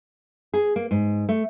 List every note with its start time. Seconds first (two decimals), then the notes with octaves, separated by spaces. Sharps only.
0.53 G#4
0.76 A#3
0.91 G#2
1.29 A3